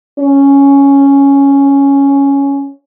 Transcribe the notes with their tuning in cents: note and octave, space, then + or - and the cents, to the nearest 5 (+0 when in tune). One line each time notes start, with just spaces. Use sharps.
C#4 +0